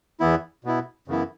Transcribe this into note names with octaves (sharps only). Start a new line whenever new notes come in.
E2 E3 B3 E4
B2 B3 E4
F#2 C#3 E3 B3 E4